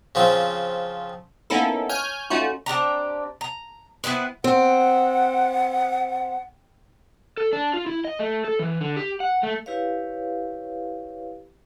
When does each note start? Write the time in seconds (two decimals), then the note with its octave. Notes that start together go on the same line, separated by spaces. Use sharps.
0.15 C#3 F3 C4
1.50 A#3 B3 C#4 D#4 E4 A4
1.89 C#5 G#5 F6 G6 G#6
2.30 A3 C#4 D#4 F4 F#4
2.66 C4 D4 G4 A#5
3.41 A#5
4.04 B3 C4 E4 B4
4.44 C4 F#5
7.37 A4
7.53 D4
7.74 F4
7.86 E4
8.05 D#5
8.19 A3
8.45 A4
8.59 E3
8.81 D3
8.96 G4
9.20 F#5
9.43 A3
9.66 E4 G4 B4 C#5 F5